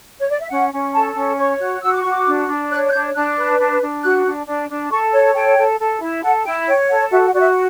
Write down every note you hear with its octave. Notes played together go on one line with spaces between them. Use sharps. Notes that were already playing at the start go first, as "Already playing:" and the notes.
C#5
D5
E5
C#4 F#5
C#4
A4 A5
C#4
C#5 C#6
F#4
F#4 E6
D6
F#4 C#6
D6
D4
D4
C#5 F#6
F#6
D4 G6
D4 F#6
B4
D4
D4
F#4 F#6
D4
D4
D4
A4 C#6
C#5 A5
A4 G5
A4
A4
E4
A4 F#5
E4 G5
C#5 G5
A4 F#5
F#4 E5
F#5
F#4 D5
E5